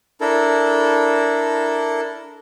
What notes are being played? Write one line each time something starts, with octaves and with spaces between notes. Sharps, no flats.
D4 E4 A4 A#4